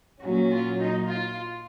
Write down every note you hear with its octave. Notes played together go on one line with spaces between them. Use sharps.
A#2 F#3 C#4 F#4
F4
D#4
F4